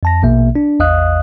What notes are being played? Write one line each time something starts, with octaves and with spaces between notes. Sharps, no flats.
F2 A5 A#6
A#1 B2 A#3 E5
D4
A1 E2 D#5 F5 D#6 F#6